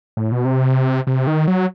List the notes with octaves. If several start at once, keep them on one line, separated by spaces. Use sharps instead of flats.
A2
B2
C3
C3
D#3
F#3